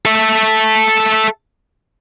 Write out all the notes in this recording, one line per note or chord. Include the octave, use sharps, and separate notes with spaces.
A4 E5